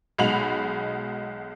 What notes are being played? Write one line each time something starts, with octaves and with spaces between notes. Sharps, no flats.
B1 G#3 F#4 B5 F7 F#7